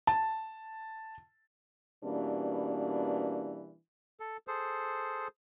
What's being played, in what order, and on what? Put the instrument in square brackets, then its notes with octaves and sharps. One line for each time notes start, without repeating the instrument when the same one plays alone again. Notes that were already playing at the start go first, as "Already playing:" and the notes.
[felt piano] A5
[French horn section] B2 E3 G3 A#3 C#4 D4
[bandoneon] A4
G#4 A4 C5